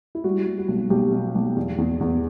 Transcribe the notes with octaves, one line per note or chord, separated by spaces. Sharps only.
E4
G3 F#4
G3
F#4
B1
B1 G4
B2
B1
E2
E2
E2